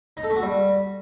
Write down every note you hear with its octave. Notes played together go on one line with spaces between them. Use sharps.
D#4
A4
A3
F#4
G3